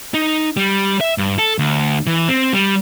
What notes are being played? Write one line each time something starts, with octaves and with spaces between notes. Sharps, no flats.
D#4
G3
E5
G2
A4
D2
E3
C4
G3